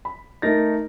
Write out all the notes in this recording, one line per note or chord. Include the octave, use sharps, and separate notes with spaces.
B5
A3 D#4 A#4 A6 A#6